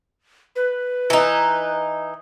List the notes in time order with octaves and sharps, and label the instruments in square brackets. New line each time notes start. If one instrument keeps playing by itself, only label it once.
[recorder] B4
[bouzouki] E3 D#4